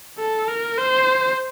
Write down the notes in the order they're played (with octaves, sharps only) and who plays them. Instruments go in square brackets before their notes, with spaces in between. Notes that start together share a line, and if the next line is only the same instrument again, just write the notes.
[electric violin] A4
A#4
C5